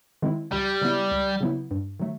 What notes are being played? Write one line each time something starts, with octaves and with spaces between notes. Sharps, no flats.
D#3 G#3 C4 E4
C#2 G3
C#3 F#3 B3 E4
C#2
C#3 F#3 B3 E4
G2
D#3 F#3 A3